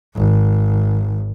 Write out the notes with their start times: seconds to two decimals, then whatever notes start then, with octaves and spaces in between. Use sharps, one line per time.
0.16 G#1